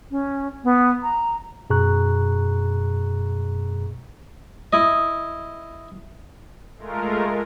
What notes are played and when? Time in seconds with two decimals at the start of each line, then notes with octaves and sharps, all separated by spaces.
0.11 C#4
0.64 B3
1.03 A#5
1.70 F#2 B2 G#4 A#5 C#6 F#6
4.73 E4 D#5
6.77 G#3 A3 F4 A#4